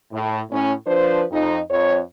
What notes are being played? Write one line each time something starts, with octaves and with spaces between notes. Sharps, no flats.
A2
A2 C#4
F3 D4 B4 C5
F2 D#4
F2 C#5